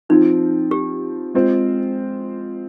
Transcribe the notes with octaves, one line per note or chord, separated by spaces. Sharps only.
F3 C4 D#4 F4
G4
G#3 C4 F4 C5